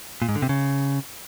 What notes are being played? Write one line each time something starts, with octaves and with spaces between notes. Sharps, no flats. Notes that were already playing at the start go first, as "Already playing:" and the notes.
A#2
G#2
D3
C3
C#3